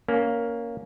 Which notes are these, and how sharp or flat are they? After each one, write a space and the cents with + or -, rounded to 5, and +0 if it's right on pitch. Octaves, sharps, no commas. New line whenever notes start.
A#3 +5 C#4 +15